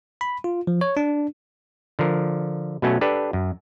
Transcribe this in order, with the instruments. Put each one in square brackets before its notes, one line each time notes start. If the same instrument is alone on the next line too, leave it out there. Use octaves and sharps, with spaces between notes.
[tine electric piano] B5
F4
F3
C#5
D4
[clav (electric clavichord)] D3 F3 A#4
B2 F#3 A3 C#4
D4 G4 A4 B4
F#2